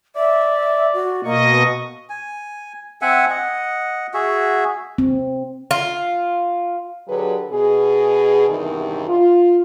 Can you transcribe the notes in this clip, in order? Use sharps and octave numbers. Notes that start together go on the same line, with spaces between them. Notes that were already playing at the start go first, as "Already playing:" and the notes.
D5 E5
F#4
B2 A#3 D#5 C#6
G#5
C4 E5 F#5 G#5
D#5 F#5
F#4 G#4 E5
C4
F4
D3 F#3 G4 G#4 B4
B2 G#4
E2 G2 C3 D#3
F4